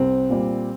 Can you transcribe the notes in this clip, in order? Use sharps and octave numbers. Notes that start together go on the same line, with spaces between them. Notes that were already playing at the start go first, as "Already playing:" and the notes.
Already playing: C2 C4
A#2 G3